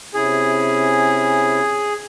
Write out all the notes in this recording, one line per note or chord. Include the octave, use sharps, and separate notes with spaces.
C3 C#4 E4 G#4